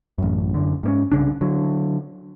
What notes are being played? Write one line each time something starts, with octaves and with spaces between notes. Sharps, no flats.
A1 F#2
F#2 D3
G#2 A#3 C#4
C2 C#3 D4
D3 F#3